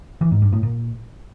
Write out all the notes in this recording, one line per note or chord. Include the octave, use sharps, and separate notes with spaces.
E3
G#2
G2
A2
A#2